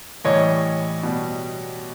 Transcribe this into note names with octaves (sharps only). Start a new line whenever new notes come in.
A2 E3 G3 C#5 D#5
B2 G3